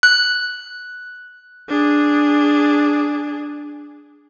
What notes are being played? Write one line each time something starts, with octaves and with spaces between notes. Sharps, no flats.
F#6
D4 G#4